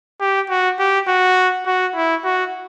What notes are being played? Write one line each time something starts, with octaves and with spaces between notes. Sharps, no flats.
G4
F#4
G4
F#4
F#4
E4
F#4